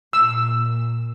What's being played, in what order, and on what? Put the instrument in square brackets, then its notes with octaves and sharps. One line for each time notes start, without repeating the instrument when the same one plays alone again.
[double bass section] A#2 [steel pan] E6